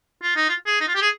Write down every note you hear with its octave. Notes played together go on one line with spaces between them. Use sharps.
F4
D#4
F4
G#4
D#4
F4
G4
G#4